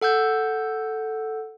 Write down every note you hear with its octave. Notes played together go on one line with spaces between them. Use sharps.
A4 F#5 E6 G6